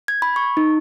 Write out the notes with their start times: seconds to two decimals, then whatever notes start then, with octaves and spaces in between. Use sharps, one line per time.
0.08 G#6
0.22 B5
0.36 C#6
0.57 D#4